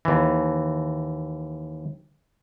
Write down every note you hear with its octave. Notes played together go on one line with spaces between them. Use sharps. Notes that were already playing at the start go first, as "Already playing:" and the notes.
D#2 E3